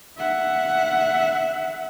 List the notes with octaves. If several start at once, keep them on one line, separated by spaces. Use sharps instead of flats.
E5 F#5